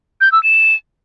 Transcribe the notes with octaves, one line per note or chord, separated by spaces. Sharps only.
G6
E6
E7